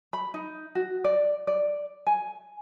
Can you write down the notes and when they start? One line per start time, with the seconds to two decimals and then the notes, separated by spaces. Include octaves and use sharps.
0.13 B5
0.34 D#4
0.75 F#4
1.04 D5
1.47 D5
2.07 G#5